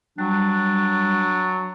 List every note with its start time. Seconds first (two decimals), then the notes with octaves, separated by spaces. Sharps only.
0.18 F#3 G3 D4